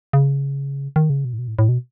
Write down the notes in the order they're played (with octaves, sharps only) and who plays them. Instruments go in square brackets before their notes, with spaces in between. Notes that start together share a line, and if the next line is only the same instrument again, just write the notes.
[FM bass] C#3
D#3
C#3
B2
A2
B2
A2
A2
B2